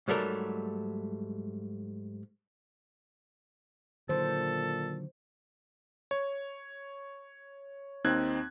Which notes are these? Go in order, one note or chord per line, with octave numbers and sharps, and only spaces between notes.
G#2 F#3 G3 A3 A#4
A#2 D3 D#3 F#3 A4 C5
C#5
D#2 C4 D#4 F#6 G#6